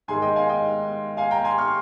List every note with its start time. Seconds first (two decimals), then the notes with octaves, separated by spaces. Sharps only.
0.08 G#2 D#3 G#3 G#5 C6
0.22 D#5 G5
0.36 F5 G#5
0.49 D#5 G5
1.17 F5 G#5
1.31 G5 A#5
1.44 G#5 C6
1.58 C#6 F6